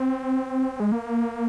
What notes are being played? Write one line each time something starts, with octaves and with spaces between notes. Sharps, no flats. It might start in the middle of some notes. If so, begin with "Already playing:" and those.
Already playing: C4
G#3
A#3